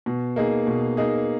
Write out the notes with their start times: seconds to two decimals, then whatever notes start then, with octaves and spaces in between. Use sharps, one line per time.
0.06 B2
0.36 A#3 D#4 G#4
0.67 B2
0.97 A#3 D#4 G#4